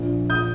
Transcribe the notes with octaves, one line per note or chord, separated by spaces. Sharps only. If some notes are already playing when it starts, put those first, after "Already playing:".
Already playing: A#1 A#2
A#2 D#6 G6